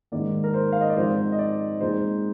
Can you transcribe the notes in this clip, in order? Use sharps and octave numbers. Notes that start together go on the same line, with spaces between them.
G#2 D#3 A#3 D5
A#4
C5
F5
D#5
D5
G#2 F3 C4 D#4 C5
D#5
D5
A#2 G#3 C4 D#4 C5